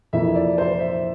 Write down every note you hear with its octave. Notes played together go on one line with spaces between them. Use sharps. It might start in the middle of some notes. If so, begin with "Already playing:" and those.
F2 C3 E3 A#3 E4 E5
D5
C5
E5